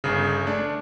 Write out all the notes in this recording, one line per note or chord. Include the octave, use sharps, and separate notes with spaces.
G1 C#3
A3 D4